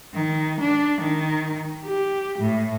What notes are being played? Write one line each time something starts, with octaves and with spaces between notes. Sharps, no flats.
D#3
D4
D#3
G4
A2